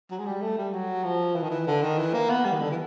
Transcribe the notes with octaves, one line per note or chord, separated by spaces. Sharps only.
F#3
G#3
G3
A3
G3
F#3
F3
E3
D#3
E3
D3
D#3
E3
A#3
B3
G3
D#3
D3
E3